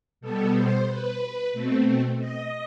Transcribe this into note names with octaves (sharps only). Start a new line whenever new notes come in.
B2 G3 B3 A4
C5
B4
B2 A3 C4
D#5